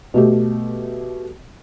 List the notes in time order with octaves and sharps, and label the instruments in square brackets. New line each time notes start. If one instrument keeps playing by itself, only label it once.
[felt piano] B2 A3 G4